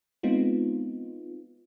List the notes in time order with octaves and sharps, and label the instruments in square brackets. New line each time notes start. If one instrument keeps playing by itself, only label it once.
[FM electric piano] G#3 B3 C4 D#4 F4